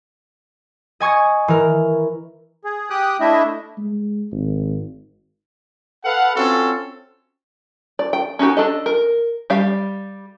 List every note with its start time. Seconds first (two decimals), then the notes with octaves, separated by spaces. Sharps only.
1.00 D#5 G#5 C#6 D#6 G#6
1.48 E3 A#4
2.64 G#4
2.90 G4 G5 D#6 F#6
3.20 A3 D4 E4 D#5 E5
3.78 G#3
4.32 G#1
6.05 A4 B4 F5 F#5
6.36 C4 C#4 F4 F#4 A4
7.99 D5
8.13 G5
8.39 C#4 D#4 F#4 G4
8.57 D4 A4 D#5
8.86 A#4
9.50 G3 G4 F5